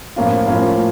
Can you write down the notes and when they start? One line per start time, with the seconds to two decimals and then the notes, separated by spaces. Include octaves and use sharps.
0.16 A2 F3 A#3 C#4 F4
0.47 A2 F3 A#3 C#4 F4